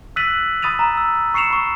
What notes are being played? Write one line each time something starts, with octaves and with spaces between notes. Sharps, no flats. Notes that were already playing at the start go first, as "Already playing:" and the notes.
E6 F#6 A6 B6 D#7 F#7
B5 D#6 A6 D#7 F7
A#5
E6
C#6 C7 C#7 E7 F7
B5 C#6